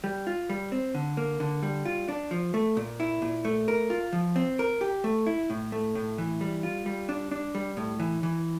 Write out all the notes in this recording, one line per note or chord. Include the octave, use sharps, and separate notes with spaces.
G3
F4
G3
C4
D3
A#3
D3
G3
F4
D4
F3
A3
A#2
E4
A#2
A3
A#4
F4
F3
C4
A#4
G4
A3
E4
A2
A3
A2
E3
G3
F4
G3
D4
D4
G3
A2
E3
E3